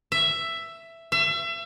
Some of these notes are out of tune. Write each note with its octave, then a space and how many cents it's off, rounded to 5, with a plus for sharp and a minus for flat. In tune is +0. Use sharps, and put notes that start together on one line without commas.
E5 +10
E5 +35